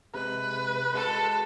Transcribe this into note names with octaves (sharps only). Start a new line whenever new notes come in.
C3 G#3 B4 F#6
G#3 F#4 A4 C6